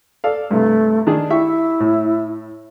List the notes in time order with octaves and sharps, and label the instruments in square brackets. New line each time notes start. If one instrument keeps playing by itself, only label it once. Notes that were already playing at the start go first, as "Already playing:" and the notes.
[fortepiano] A4 D5 F5
[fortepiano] G2 C3 [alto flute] A3
[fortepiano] D#3 D4 G#4
[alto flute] E4 [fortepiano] G4 E5 C#6
[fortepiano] A2